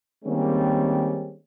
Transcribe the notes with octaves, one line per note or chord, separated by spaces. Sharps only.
D#3 G3 G#3 A#3 C4 C#4